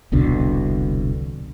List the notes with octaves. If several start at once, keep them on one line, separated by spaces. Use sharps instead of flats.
E1 C2 B2 D3